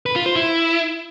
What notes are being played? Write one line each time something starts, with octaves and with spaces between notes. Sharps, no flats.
B4
F4
C5
E4